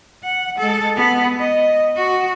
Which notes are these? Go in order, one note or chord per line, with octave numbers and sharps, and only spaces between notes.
F#5
G#3 A4
B3
D#5
F#4